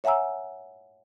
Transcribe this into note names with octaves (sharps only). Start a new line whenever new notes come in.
C#5 E5 F#5 G#5 A#5 E6